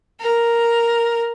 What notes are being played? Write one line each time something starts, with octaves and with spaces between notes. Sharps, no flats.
A#4